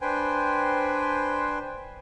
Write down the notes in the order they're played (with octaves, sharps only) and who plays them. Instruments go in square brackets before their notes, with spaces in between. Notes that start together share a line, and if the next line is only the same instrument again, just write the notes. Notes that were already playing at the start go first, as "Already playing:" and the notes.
[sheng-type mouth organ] D4 B4 C5 G5 G#5